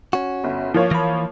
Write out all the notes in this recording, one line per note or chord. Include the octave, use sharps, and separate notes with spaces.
C#4 F#4
G1
F3 A#3 C#5
E3 B5